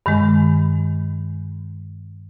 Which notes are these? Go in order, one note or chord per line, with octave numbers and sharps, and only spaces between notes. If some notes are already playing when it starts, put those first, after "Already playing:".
G2 D#3 G#3